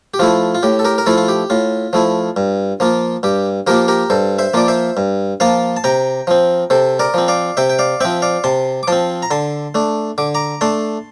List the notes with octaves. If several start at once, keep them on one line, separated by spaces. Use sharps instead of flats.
G4
F3 A3 E4 F4
F4
A2 G4
A4
G4 A#4
A#4
F3 A3 E4 F4 A4
F4
G4
A2 F4
F3 A3 E4
G2
F3 A#3 F4
G2 G4
F3 A#3 F4 G4 A#4
G4 A#4
G2 A4 C5
C5 E5
F3 A#3 F4 D5
C5 E5
G2
F3 A#3 F4 F5 A5
A5
C3 G5 A#5
F3 C4
C3 A4 C5
A#4 D5
F3 C4
D5 F5
C3 E5 G5
G5
D5 F5
F3 C4 E5 G5
D5 F5
C3 A5 C6
D6
F3 C4 A5 C6
A#5
D3 A5 C6
A3 D4
D3 D6
A#5 D6
A3 D4 A5 C6